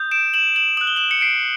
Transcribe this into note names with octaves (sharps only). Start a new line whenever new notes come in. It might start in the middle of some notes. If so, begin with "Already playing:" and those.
Already playing: D#6 G6
D7 E7
E7 F#7
E7 F#7
D#6 F#6 F#7
G7
E7 F#7
C#7
C7 D7